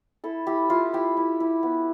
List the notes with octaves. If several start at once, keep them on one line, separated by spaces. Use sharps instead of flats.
E4 A4
E4 G4
E4 F4
E4 G4
E4
E4
B3